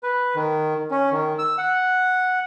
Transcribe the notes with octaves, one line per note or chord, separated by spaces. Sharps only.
B4
D#3
C#4
D#3
E6
F#5